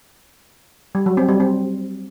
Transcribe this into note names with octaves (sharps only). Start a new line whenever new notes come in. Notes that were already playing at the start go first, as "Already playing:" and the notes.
G3
F#3
C4
G3
C4